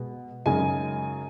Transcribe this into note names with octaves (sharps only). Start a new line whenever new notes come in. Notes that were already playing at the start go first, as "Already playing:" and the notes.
Already playing: B2 G#3 B3
F#2 C#3 G#3 D#4 G#5